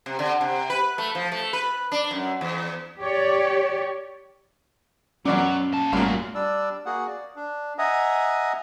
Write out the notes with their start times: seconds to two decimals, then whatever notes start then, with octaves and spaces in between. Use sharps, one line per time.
0.06 C3
0.19 D3
0.41 C3
0.70 B4
0.98 A3
1.15 F3
1.32 A3
1.53 B4
1.92 D4
2.11 F#2
2.41 E2
3.00 G4 C#5 D5
5.25 F#2 B2 F#3 C#4 D5
5.72 A#2 A5
5.93 G#1 F#2 A#2 G3 A3 F#4 F5
6.35 G3 D4 D5 E6
6.86 A#3 F#4 G#4 F#5
7.07 D5
7.36 D4
7.78 D#5 E5 F#5 G#5 A#5 D#6